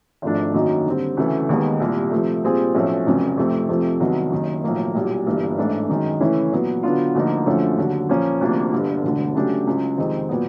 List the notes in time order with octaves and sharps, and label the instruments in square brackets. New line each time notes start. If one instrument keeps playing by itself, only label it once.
[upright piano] G#1 G#2 F3 A3 D4
F#2 D#3 F#3 A#3 D#4
D3 G3 C4
D2 C#3 E3 A3
D#2 D#3 G#3 B3
C2 A#2 G3
C3 F3 A3
A#2 G3 C4 F4 G#4
B1 A2 F3 A3 C#4
F1 F2 C#3 F#3
F2 C3 F3 A3 C4
F2 C3 F3 A3
C2 C3 D#3 F#3 B3
F#1 F#2 D#3
B1 A2 F3 A#3
B1 A#2 G3
G1 G2 E3 G3 A#3
A1 G#2 E3 A3 D4
F#2 D#3 G#3
C#3 E3 A3 C#4 E4
A#2 F#3 B3
D3 F#3 B3 D4 F4
D2 D3 F3 A#3 D#4
F#2 D3 F3 A3 C#4
D#2 D3 F#3
A#2 F3 A#3 C#4
D2 C3 F3 A#3 D4
G1 G2 D3
E1 D2 D3
C#3 F#3 A3 D4 G4
C#2 C#3 F#3
F2 C3 D#3 G#3 C4
A#2 F#3 B3